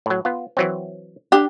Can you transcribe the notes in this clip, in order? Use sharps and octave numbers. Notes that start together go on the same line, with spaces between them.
A2 F#3
B3 F4
E3 F#3 C4
D4 G4